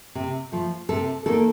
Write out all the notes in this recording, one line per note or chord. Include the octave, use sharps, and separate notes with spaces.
C3
F3 A3
C3 A4
D#3 A#3 A4